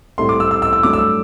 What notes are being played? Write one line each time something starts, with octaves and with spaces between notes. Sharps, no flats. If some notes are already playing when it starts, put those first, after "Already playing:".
A2 G3 C4 E4 A4 C6
D6
E6
E6
E6
E6
G2 F#3 A3 D6
E6